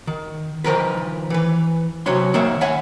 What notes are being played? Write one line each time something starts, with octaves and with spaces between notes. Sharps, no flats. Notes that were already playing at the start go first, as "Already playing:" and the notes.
D#3
D#3 F3 A#4 B4
E3 B4
C3 F#3 B4 C#5 C6
D#3 A#3 C#5 E5
C#5 E5 F#5 G#5 B5